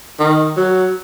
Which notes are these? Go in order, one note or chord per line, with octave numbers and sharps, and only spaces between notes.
D#3
F#3